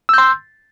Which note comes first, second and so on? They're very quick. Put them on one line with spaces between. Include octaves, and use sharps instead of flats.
E6 G6 C6